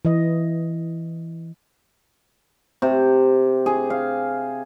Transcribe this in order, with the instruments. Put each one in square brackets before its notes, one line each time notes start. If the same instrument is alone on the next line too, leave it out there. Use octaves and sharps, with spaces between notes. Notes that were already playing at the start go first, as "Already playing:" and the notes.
[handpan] E3 D#5
[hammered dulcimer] C3
G#4
F5